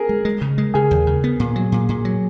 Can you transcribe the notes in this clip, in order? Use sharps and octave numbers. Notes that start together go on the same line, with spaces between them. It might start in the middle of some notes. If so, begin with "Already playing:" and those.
Already playing: G#4 A#4
G#3
G#3
C#3
G#3
C#3 G#4
D#2
C#3
B3
A#2
F#3
A#2
A#2
F#3